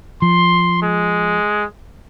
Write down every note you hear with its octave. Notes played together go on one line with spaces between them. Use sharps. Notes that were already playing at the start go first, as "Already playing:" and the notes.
F3 C6
G#3